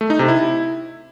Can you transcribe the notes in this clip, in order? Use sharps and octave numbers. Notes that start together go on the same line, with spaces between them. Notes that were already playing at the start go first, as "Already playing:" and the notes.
A3
D#4
C3
E4